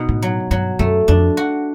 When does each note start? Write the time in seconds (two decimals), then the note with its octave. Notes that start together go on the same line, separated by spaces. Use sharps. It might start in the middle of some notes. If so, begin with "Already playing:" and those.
Already playing: B2 D#4
0.09 A2
0.22 F#3
0.51 G2 F#3
0.79 F#2 A3
1.08 F2 D4
1.37 F#4